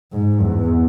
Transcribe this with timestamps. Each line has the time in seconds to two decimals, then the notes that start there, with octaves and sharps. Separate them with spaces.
0.13 G#2
0.42 E2